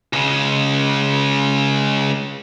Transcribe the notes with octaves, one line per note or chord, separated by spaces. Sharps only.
C#2 C#3